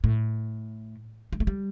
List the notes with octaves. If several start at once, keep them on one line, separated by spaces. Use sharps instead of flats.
A2
G3
A3
G3